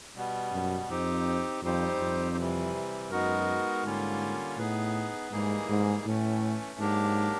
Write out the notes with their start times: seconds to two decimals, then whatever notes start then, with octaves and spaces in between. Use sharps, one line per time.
0.15 B2 G3 B3
0.52 F#2
0.89 F2 C4 D#4 G4
1.62 F2 G3 C4 D#4 G4 C5
1.99 F2
2.37 C3 E3 G3
3.10 F#2 G#3 B3 D#4 F#4 A#4
3.84 G#2 D3 G3 A#3 C#4 F4
4.58 A2 B3 D#4 G#4 B4
5.32 G#2 E3 G3 A#3 D#4 G#4
5.69 G#2
6.06 A2 E3 A3 C#4
6.79 G#2 F#3 A#3 D4 G4 A#4